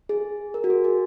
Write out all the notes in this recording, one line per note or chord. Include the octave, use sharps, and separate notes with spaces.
G#4
A#4
F#4
G#4
G#4